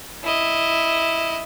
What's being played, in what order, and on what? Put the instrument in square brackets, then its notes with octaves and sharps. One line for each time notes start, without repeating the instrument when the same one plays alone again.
[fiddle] E4 D#5